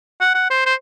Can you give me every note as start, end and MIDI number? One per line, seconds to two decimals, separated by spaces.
0.21 0.31 78
0.35 0.50 78
0.50 0.62 72
0.66 0.74 72